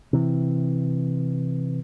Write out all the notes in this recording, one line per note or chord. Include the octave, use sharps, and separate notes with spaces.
C3 E3